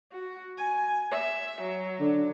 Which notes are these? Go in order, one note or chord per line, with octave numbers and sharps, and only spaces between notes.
F#4
G#5
E5
F#3
D3